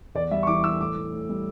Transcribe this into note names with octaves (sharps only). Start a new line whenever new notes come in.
E2 D5
G3 E5
C#6
E3 D6
E3 E6
A2 D6
A2
A2
G3